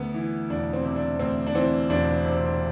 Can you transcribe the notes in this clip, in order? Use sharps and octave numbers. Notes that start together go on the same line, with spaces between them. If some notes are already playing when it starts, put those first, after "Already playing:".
Already playing: D2 B3
E3
E1 D4
C4
C3
D4
D2 C4
D4
E3 C4
E1 D4
C3